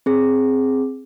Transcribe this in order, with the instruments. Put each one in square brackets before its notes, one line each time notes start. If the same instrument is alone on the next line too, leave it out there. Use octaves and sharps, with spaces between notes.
[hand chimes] C4 G#4